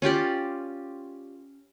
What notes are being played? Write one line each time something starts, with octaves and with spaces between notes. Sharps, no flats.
C#4 F4 G4 D5